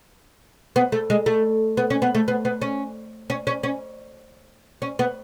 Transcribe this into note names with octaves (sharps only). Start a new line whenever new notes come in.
B3
A3
G#3
A3
B3
C#4
B3
A3
B3
B3
C#4
C#4
C#4
C#4
C#4
B3